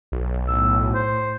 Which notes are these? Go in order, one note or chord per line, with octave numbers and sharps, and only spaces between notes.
B1
A2 E6
C5